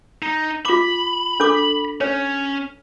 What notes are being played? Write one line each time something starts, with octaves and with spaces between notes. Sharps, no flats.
D#4
F4 B5 D6
D4 A4 D6
C#4 C#5